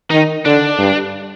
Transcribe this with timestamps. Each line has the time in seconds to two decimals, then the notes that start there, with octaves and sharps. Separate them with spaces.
0.10 D#3 D#4
0.45 D3 D4
0.79 G2